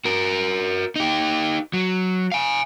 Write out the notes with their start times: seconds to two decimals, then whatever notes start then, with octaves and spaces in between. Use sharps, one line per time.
0.05 F#4 A#4
0.96 D#4 G4
1.73 F#3
2.32 F5 G#5